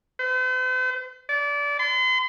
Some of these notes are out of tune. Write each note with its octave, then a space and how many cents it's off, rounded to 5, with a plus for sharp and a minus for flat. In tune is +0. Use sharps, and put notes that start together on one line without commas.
C5 -45
D5 -25
C6 -40